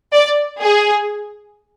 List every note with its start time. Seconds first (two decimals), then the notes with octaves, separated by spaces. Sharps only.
0.13 D5
0.62 G#4